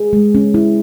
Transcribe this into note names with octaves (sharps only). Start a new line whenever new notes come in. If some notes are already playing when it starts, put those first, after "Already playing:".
Already playing: G#4
G#3
C#4
E4